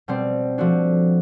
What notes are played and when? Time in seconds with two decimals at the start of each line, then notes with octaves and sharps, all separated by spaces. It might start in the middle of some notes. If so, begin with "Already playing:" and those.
0.08 B2 G3 C4
0.58 F3 A3 D4 F#4